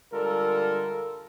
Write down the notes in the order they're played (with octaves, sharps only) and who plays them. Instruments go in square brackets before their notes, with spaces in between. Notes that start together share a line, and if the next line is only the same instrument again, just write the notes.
[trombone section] D3 G3 G#3 F4 A4 A#4